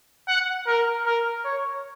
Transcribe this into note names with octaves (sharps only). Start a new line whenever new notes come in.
F#5
A#4
A#4
C#5